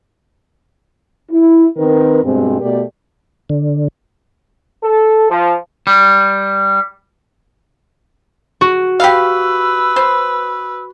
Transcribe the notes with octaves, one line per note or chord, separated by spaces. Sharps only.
E4
D#3 C4 A#4 B4
G2 B2 G#3 C4
B2 A3 G4 A#4 D5
D3
A4
F3
G3
F#4
G4 B4 F5 E6
C5